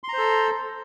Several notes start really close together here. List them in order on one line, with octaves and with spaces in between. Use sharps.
C6 A#5 C5 A4